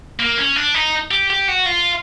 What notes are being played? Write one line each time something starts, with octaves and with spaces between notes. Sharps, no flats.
A#3
C#4
D4
D#4
G4
G4
F#4
F4